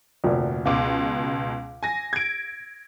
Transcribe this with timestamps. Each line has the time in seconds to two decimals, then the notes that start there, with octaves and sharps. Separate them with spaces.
0.24 F1 D2 A#2
0.66 C#2 B2 F5 D6
1.83 G#5 A#6
2.13 G#6 D7